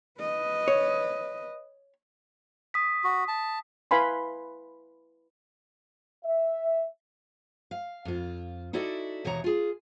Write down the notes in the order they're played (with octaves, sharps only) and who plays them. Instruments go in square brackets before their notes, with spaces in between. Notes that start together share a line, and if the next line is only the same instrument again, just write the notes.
[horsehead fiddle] B4 D#5
[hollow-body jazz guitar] C#5
[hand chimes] D#6 B6
[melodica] F#4
A5
[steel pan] E4 B4 F5 G#5 B5 C6
[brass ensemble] E5
[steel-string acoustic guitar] F5
F2 F4
D#4 E4 F#4 A4 D5
D#2 B2 E3 C#5 A#5
F4 G#4